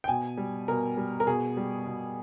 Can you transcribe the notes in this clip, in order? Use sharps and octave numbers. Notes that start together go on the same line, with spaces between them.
G5
B2 G#5
G3
B2 A#4
G3
A#4
B2 G#4
G3
B2